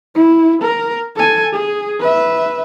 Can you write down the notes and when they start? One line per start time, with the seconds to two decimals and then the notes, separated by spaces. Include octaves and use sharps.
0.15 E4
0.62 A#4
1.16 A4 G#5
1.53 G#4
2.00 B4 E5